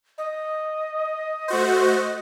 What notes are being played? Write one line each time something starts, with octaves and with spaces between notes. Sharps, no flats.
D#5
A3 F#4 C5